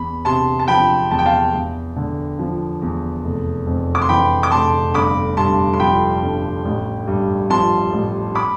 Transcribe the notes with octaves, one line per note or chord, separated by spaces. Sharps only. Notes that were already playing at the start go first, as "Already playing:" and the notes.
Already playing: E2 B5
C3 A5 C6
A5
F3 G5 B5
E2 A5
G5
F5 A5
E2
D3
F3
E2
F1
F2
D6
C6
E3 G5 B5
D6
F1 A5 C6
G1 B5 D6
G2 A5 C6
C6
F3 G5 B5
G1
A1
G2
F3 A5 C6
A1
B5 D6